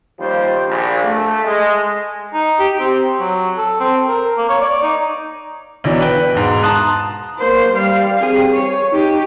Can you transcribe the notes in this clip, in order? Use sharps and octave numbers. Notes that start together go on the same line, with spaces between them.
D#2 F3 G3 C5
A#1
A3
G#3
D#4
G4
C4
F#3
A4
C4
A#4
A#3
C#5
D5
D#4
B1 E3 F#3 D4
B4 G5
E1 G#2
A5 A#5 C6 D#6 F#6
A#3 C5
G3 F5
C4 G#4
C#5
D#4 G4